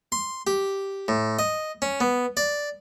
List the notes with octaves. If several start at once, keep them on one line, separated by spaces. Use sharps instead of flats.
C6
G4
A2
D#5
C#4
B3
D5